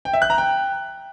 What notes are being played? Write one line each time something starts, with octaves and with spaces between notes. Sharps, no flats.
G5
E5
F#6
A#5
G5